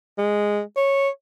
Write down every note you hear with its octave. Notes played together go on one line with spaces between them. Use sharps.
G#3
C#5